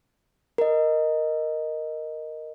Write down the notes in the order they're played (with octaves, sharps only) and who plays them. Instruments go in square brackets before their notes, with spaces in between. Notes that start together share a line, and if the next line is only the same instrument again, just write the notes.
[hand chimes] A#4 D#5